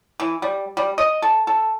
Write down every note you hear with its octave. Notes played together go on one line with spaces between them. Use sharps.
E3
G3
G3
D#5
A4
A4